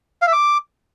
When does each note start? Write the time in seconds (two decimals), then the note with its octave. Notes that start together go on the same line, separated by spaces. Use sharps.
0.22 F5
0.27 E5
0.33 D6